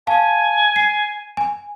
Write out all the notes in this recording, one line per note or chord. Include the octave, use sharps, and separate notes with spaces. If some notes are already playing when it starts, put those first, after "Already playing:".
F5 G#5 A5
C7
G#5